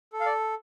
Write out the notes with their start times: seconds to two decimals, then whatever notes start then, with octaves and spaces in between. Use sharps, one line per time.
0.13 A4
0.20 F5
0.26 D5